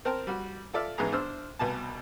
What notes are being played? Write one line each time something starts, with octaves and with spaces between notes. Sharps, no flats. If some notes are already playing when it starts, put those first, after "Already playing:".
C4 A#4 G5 A5
G3 F#4
F4 A4 D5 E5 F6
A1 G#2 B3 G#4 A#5
D4 C5 E6 F6
C2 B2 B3 G#5 A5